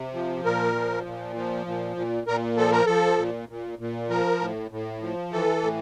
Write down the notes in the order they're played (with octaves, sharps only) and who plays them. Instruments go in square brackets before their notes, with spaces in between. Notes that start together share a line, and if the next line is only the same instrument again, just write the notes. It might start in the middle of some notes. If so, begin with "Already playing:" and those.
Already playing: [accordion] C3
F3
A#2 A#4
F3
A#2
F3
A#2
A#2
A#2 A#4
F3 A4
A#4
F3 A4
A#2
A#2
A#2
F3 A#4
A2
A2
F3
E3 A4
A2